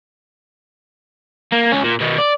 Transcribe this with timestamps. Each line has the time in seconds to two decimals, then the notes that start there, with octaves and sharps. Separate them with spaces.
1.52 A#3
1.72 C#2 C#4
1.84 A#2
2.00 B2 D#3
2.19 D5